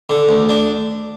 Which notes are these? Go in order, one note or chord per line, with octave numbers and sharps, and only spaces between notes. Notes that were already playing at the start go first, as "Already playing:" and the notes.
D3
D2
D4